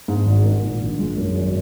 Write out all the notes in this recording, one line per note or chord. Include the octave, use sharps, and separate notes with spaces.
G#2
G#1
D#3
A#2
A#1
G#3
F#2
G#1